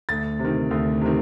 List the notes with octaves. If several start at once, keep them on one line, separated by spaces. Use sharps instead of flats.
D2 A6
C3
D#3
D2
C3 D#3